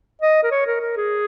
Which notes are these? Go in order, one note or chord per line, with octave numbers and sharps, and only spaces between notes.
D#5
A#4
C#5
A#4
A#4
G#4